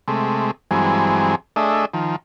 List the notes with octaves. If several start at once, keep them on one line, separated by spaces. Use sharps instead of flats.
C3 G#3 A3
G2 E3 F#3 G#3 C4 G#5
A3 D4 G#4 D#5 E5
D#3 F3